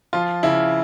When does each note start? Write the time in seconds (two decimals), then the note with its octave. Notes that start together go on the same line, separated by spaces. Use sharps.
0.13 F3 F4
0.43 C#3 E4